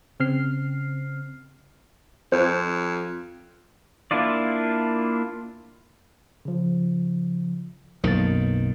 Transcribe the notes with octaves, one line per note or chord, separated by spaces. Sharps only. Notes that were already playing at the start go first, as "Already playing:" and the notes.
C#3 C4 F6 C7
F2 C5
A#3 D4 E4 F4 D5
C#3 F3
B1 F#2 D#3 A#3 A6